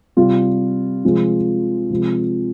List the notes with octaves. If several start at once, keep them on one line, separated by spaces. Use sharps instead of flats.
C3 G3 F4
C3 F3 G#3
C3 F3 G#3